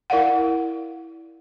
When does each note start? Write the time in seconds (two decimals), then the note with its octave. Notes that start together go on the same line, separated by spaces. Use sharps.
0.10 E4 A#4 D5 F5 F#5